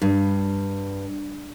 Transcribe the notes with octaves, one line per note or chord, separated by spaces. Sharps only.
G2